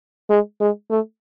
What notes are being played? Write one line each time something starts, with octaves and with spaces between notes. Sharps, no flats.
G#3
G#3
A3